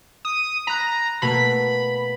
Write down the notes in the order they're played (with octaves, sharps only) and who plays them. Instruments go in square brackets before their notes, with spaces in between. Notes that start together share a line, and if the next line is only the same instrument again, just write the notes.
[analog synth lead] D#6
[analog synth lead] A#5 [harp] B5 F#6
[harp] B2 A3 A#3 [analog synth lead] B5